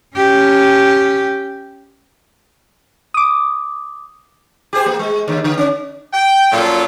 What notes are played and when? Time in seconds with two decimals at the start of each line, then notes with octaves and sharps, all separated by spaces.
0.17 C#4 G4
3.14 D6 D#6
4.73 G4 G#4 C5
4.86 A#3
4.99 G#3
5.28 D#2 D3
5.44 D3
5.58 C#4
6.13 G5
6.52 A#2 F3 F#3 C#4 F4 A4